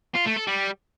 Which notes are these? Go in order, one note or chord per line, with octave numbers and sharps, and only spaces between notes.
F4
A3
A4
G3